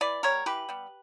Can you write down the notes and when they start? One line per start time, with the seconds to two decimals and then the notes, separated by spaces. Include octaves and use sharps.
0.01 E3 B4 D5
0.23 G3 B3 A#4 C#5
0.46 E3 G4 B4
0.69 G3 B3